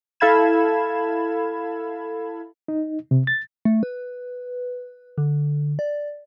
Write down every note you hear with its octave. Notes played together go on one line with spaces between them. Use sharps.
E4 A4 F5 B5 G#6 E7
D#4
C3
A6
A3
B4
D3
D5